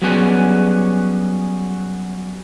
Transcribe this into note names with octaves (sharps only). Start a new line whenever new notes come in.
F#3 G3 B3 C#4 F#4 G#4